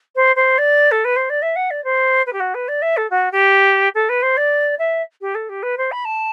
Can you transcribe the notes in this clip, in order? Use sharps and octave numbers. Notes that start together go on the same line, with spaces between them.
C5
C5
D5
A4
B4
C5
D5
E5
F#5
D5
C5
B4
G4
F#4
B4
D5
E5
A4
F#4
G4
A4
B4
C5
D5
E5
G4
A4
G4
B4
C5
B5
A5